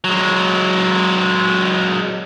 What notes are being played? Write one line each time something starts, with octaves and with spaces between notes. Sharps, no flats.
F#3 G#3